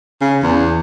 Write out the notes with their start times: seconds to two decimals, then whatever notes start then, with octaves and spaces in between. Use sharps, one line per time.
0.21 C#3
0.43 E2